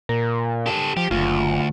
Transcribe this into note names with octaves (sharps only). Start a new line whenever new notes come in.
A#2 A#4
G4 A4
F3 G4
F#1 D2 F4